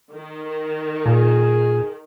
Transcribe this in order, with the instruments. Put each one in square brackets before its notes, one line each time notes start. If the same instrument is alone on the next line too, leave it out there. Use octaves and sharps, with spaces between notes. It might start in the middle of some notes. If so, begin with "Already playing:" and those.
[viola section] D#3
[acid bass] A#2 [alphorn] G#4